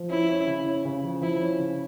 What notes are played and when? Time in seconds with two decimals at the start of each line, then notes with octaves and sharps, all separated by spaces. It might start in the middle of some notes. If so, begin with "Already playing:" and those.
Already playing: F3
0.10 C#4 E4
0.29 C#4
0.47 C#3
0.66 C#4
0.85 C#3
1.03 F3
1.21 F3 E4
1.41 C#4
1.59 C#3